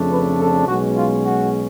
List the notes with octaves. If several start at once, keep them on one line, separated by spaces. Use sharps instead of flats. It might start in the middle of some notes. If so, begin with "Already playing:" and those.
Already playing: F2 C#3 F3 A3 D4
B4
A4
B1 B2 G#3 C#4 F#4
F4
F#4